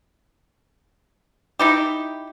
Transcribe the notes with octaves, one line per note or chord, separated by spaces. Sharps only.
D#4 E4 G4